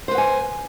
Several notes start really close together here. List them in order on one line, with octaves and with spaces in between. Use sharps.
C5 B4 F#5 G#5